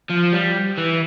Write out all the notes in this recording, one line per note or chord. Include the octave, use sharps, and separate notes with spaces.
F3
G3
E3